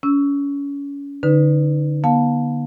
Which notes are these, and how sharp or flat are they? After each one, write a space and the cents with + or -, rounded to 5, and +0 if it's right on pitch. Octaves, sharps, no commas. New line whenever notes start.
C#4 +30 E6 +0
D3 +0 D#4 +0 B4 +10
B3 -45 F5 +30 A5 +0